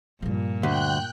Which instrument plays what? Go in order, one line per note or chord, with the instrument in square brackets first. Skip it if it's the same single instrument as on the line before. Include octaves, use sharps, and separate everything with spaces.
[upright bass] G2 F3 [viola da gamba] A#2
[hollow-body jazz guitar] D2 [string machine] G5 F#6 G6